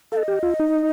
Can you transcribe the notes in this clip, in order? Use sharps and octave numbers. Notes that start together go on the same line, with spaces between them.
A4 D#5 F5
G4
F4
D#4